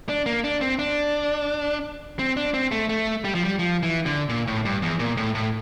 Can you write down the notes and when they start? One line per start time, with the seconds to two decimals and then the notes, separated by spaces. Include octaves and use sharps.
0.09 D4
0.26 A#3
0.44 D4
0.61 C4
0.79 D4
2.19 C4
2.37 D4
2.54 C4
2.71 A3
2.89 A3
3.24 G3
3.35 F3
3.45 G3
3.59 F3
3.83 E3
4.06 D3
4.29 A#2
4.47 A2
4.65 G2
4.82 E2
4.99 A#2
5.17 A2
5.35 A2